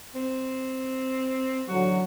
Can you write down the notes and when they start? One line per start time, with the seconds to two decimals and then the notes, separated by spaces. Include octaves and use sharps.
0.15 C4
1.69 A1 D3 F#3 F#4